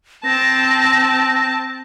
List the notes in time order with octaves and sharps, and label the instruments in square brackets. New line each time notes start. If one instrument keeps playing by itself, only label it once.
[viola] C4 A5 [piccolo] A#6